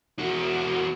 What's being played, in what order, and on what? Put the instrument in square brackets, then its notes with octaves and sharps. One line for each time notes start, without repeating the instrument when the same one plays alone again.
[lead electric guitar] E2 F#4